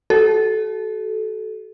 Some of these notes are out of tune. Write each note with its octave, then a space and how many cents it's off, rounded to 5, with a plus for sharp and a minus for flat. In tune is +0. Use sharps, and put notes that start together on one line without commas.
F#4 +35 A4 -20